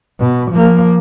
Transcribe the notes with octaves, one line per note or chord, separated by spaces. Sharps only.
B2
F3 A#3